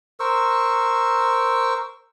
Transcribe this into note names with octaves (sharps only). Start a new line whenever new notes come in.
A#4 C5 C#6 E6